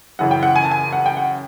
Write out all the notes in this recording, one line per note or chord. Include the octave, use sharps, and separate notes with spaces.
F#2 C#3 E3 F#5
G5
F#5
G#5
A5
G#5
F#5
G5
F#5